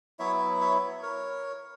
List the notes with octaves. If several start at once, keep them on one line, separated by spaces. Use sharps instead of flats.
F#3 B3 E4 C#5 E5
C#5 E5
A#4 C#5